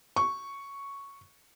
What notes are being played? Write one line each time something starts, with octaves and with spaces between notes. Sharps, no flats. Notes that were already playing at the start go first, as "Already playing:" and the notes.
C#6